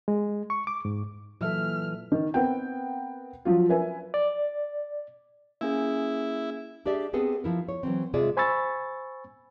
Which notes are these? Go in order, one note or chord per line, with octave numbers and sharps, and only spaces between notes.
G#3
C#6
D6
G#2
A#2 E3 F#3 A4 E5 F6
D#3
B3 C4 A#4 B4 F#5 G5
F3 F#3 F4
A#4 B4 E5 G#5
D5
A#3 C#4 E4 G#4
D4 G4 G#4 D5 E5
B3 C4 G#4 A4 B4
F3 E4 A#4
C#5
E3 F#3 C4
C3 G#3 F4 G#4 D5 E5
C5 G#5 B5 C#6 E6 A6